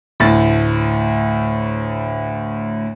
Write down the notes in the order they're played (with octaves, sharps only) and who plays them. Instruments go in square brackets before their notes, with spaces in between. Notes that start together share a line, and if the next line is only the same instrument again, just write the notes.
[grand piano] D2 A2 A6